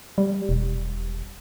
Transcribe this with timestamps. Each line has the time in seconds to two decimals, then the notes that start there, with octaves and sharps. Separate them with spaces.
0.18 G3
0.49 E1